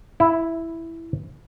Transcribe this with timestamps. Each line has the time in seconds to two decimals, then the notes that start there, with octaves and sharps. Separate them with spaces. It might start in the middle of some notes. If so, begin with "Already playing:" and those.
0.20 E4